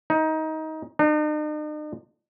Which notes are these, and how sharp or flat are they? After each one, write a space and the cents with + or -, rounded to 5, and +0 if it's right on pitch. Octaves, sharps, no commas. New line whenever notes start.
D#4 +20
D#4 -45